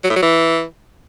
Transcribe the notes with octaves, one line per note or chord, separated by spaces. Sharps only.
F#3
A2
F#3
E3